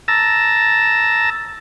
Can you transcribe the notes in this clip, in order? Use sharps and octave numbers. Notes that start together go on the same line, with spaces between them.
A5 A#5 E6